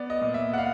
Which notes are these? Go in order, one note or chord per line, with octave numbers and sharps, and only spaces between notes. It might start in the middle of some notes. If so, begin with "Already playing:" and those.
Already playing: B3 D5
D#5
A#2
E5
F#5
B3 F5